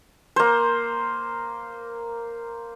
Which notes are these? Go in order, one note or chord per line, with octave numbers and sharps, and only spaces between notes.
A#3 C5